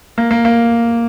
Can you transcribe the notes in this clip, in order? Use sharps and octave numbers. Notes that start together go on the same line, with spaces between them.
A#3
A#3
A#3